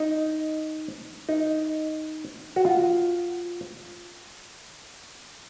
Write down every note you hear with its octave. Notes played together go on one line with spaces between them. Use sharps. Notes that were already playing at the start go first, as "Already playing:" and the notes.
Already playing: D#4
D#4
F#4
F4